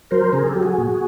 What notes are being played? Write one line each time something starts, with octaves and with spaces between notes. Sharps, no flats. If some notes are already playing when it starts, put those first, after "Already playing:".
F#3 A#4 C5
C#3 G#4 A#4
G4 A4
F#3
F#4 G#4
A#2